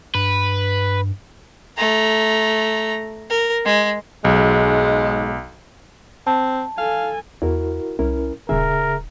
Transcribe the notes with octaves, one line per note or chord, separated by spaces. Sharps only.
G2 B4
A3 A#5
A#4
G#3
B1 G#2 G#3
C4 A5
A4 F5 G#5
E2 E4 F#4 A#4
C2 C#4 E4 A#4
D#1 C#3 G#4 A#4 E5